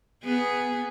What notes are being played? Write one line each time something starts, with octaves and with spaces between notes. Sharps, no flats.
B3 G#4